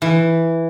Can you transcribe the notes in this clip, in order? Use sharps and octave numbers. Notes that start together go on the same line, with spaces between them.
E3